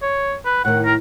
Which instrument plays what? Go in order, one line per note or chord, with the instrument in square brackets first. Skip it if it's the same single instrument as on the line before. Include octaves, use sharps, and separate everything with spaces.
[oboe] C#5
B4
[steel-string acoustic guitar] A2 D#3 [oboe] F#5
[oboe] A#4